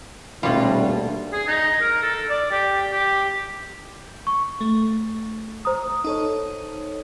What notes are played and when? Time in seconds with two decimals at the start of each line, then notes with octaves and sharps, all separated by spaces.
0.43 D#1 B2 D3 G3 A3 F4
1.33 G#4
1.48 D#4
1.81 A#4
2.02 A4
2.30 D5
2.51 G4
2.92 G4
4.27 C#6
4.61 A3
5.65 C5 A#5 D#6
6.04 D#4 A4 C#5